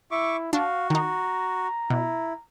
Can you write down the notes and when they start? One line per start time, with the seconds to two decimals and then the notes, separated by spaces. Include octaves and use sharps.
0.11 E4 E5 C#6 D6
0.53 D4 F#4 F5
0.90 D#3 D#4 A#5
1.90 B2 E4